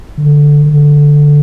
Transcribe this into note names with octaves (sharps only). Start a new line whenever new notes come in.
D3
D3